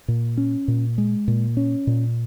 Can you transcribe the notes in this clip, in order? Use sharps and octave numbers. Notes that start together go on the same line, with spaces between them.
A#2
C#4
A#2
G#3
A#2
C#4
A#2